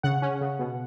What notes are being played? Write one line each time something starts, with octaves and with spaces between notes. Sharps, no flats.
C#3 F#5
C#4
C#3
B2